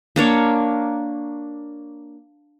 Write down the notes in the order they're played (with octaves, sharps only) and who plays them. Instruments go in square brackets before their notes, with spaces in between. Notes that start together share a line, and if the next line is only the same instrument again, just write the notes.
[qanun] A#3 D4 C#5